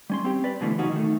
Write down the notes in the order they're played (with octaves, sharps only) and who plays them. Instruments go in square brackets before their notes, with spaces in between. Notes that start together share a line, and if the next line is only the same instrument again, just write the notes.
[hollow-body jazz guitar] G3 C#4 C6
C4 G4
B4 D5
B2 D3 E3 F3 G3 A3
A#2 C#3 F#3 C#4 D#4 F#4
D#3 A3